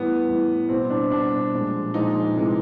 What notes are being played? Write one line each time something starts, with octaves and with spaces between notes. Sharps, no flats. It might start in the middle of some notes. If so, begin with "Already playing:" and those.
Already playing: A2 E3 G3 B3
A2 E3 G3
B2 G3 C4
D4
B2 G3 D4
A#2 F3 G#3
A#2 F3 G#3 D#4
C3 E3 G#3